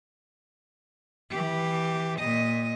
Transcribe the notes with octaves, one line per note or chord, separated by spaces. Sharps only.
E3 G4
A#2 D#5